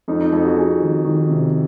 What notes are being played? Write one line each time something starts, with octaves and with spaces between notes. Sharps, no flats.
F2 D#4
D#4
F2 D#4
F#4
F2 G#4
D#3
D#3
C3